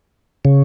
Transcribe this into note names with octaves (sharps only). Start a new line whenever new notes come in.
C#3